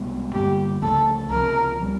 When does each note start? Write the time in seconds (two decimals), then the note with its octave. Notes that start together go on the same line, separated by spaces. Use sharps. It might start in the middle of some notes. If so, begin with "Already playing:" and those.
Already playing: C2 B2 G#3 B3
0.33 G2 D3 G3 A#3 G4
0.82 C#2 C#3 F3 A3 A4
1.30 C#2 C3 F3 A#4
1.81 B2 G3